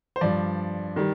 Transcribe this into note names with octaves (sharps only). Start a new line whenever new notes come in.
C5
G2 F3 D5
D#3 G3